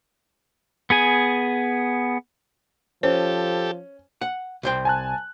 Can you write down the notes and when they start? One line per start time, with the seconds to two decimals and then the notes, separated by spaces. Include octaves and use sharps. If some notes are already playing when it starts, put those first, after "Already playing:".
0.90 B3 G#4 G#5
3.03 F3 C#4 G4 A4 C5
4.21 F#5
4.63 C2 C5 G5
4.85 G#5 A5 F#6